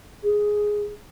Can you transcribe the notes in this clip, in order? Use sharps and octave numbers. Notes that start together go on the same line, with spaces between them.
G#4